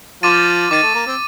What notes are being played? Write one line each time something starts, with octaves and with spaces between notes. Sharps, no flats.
F3 F4 D6 A6 D#7
D#3 D#4 D6 A6 D#7
A3
A#3
C4